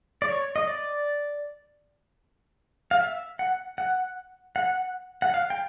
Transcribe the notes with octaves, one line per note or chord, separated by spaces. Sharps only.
D5
C#5
D#5
D5
F5
E5
F#5
F#5
F#5
F#5
F5
G5